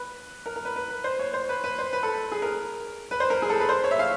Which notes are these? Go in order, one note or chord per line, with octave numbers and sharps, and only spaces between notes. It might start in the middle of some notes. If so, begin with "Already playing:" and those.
Already playing: B4
A#4
A#4
B4
B4
B4
C5
C#5
C5
B4
B4
C5
B4
A4
G#4
A#4
B4
C5
A#4
G#4
A4
B4
C5
C#5
E5
F5